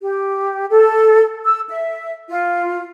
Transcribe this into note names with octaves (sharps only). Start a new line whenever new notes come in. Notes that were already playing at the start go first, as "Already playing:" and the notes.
G4
A4
E6
E5
F4